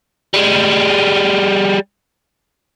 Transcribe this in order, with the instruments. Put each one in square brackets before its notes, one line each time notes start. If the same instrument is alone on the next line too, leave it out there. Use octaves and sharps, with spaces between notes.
[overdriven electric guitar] G3 G#3